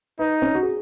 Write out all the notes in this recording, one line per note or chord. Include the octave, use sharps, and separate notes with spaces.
D#4 B4
C#4
F#4
G#4